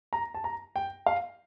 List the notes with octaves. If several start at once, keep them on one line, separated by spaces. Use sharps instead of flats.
A#5
A5
A#5
G5
F5